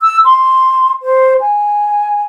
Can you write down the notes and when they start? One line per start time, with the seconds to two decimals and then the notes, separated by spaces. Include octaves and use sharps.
0.01 E6
0.25 C6
1.03 C5
1.41 G#5